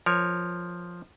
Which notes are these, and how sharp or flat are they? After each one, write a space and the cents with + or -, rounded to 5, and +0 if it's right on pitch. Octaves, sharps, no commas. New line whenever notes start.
F3 +0 A#4 +5 C#5 +0